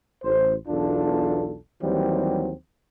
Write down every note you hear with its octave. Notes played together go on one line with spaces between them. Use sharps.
A1 C5
B1 E2 D4 F4 A4
D#2 E3 F#3 G3 C4